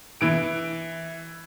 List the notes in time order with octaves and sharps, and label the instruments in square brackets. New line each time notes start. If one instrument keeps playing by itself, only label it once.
[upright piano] E3 D7